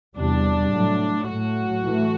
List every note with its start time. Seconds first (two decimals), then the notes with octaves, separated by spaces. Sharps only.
0.16 E2 C3 G3 D4
0.71 A2 F#3 A3
1.26 A2 F#3 A3 F#4
1.82 A2 E3 A3